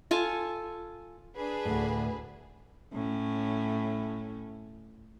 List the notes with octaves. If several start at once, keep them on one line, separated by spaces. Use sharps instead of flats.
F4 A4 G#5 A5
D4 G#4 B4
D2 A2
A2 C#4